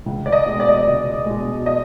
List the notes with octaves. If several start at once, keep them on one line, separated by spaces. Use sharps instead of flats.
C#2
D5
D#5
B2 G#3
D5
D#5
D5
C#2
B2 G#3
D#5